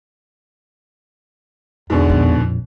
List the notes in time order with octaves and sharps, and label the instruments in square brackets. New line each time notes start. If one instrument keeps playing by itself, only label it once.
[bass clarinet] E2 [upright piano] G#2 B2 D3
[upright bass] A#1 F2